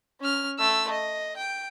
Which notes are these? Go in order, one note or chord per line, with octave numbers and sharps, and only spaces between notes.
C#4 F6
A3 E6
D#5
G5